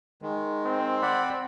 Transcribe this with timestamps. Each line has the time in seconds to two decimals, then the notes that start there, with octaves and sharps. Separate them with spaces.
0.22 D#3 G#3
0.66 C4
1.02 D5 F#5 B5